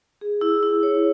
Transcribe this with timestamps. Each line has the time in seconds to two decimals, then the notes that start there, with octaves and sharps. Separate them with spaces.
0.21 G#4
0.41 E4
0.63 E4
0.83 C#5